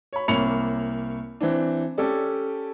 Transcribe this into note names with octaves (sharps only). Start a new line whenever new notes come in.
C#5 B5
C2 A#3 C#5 B5 C#7 F7
E3 C4 D4
C#4 G4 A4 D5